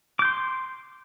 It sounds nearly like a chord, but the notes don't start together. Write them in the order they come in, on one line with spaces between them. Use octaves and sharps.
D6 G6 C6